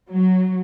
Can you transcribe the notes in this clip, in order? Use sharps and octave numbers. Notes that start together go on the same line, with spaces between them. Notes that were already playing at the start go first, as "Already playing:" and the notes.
F#3